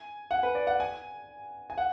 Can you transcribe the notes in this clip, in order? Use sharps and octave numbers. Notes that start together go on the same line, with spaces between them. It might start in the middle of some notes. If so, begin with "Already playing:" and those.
Already playing: G#5
F#5
B4
D5
F#5
G#5
G#5
F#5